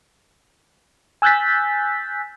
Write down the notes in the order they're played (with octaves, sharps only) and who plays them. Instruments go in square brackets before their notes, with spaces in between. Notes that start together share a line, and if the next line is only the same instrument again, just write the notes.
[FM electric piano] G#5 E6 F#6 G6 A6 B6